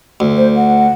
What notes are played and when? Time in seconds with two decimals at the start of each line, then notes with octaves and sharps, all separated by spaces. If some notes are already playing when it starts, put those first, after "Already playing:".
0.20 D2
0.37 C5
0.56 F#5